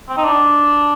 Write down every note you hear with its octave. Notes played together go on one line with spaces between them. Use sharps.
C4
D#4
D4